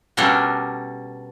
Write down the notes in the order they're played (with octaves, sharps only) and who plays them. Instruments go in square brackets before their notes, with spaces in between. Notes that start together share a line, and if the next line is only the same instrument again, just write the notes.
[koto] B2 G3 C#4 D4 A4 A#4